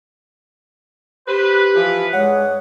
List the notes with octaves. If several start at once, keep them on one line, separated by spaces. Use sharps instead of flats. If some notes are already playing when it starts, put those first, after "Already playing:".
G4 B4 C5
E3 F3
G2 G#3 C#5 F#5